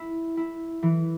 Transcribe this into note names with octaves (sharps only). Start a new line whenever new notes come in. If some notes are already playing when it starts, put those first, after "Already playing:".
Already playing: E4
E4
E3